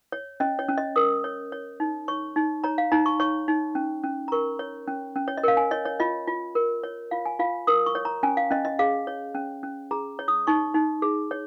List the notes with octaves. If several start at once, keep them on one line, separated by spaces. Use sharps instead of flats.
C#5
C#4 D#5
C#5
C#4
D#5
A#4 D#6
C#5
C#5
D#4
C#5 C#6
D#4
C#5 A#5
F5
D#4 A#5
C#6
C#5 C#6
D#4
C#4
C#4
A#5
A#4 C#6
C#5
C#4
C#4
C#5
D#5
A#4 F5
G#5
C#5 D#5
C#5
F4 D#5
F4
A#4
C#5
F4 F5
G#5
F4 F5
A#4 D#6
C#6
C#5
A#5
C#4 G#5
F5
C#4 D#5
D#5
G#4 F5
C#5
C#4
C#4
G#4 A#5
C#5
D#6
D#4 C#6
D#4
G#4
C#5